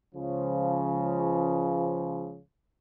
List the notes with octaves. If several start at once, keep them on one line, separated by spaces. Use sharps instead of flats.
C#2 C#3 F3